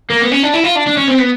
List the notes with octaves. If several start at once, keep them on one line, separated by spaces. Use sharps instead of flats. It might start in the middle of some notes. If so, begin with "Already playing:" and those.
A#3
B3
C#4
D4
E4
F4
D4
D4
C#4
C4
B3